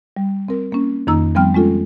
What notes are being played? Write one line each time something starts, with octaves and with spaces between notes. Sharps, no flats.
G3
C4 A#4
A#3 C#4
F2 D#3 A#3 D#4 A#5 E6
F3 G3 B3 C4 G5 F6
G#3 C#4 F4 A4